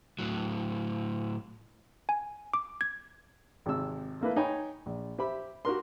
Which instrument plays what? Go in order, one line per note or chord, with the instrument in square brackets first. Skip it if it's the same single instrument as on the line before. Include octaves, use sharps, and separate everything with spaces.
[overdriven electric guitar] A2 F#3
[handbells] G#5
D6
G#6
[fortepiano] G#1 C3 E6
A3 A#3 E4 B4
D#4 C#5 G5 G#5 B5
A#1
G4 C5 E5 B5
F#4 G4 A#4 C6